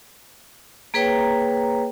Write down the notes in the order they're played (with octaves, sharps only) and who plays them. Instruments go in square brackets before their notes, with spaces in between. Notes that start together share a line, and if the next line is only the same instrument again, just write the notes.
[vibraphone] A#3 G#4 B4 C#5 G5 A#5